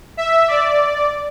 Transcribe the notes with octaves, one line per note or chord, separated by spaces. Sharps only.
E5
D5